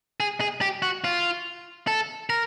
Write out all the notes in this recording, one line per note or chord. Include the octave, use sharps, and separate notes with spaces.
G#4
G#4
G4
F#4
F4
A4
A#4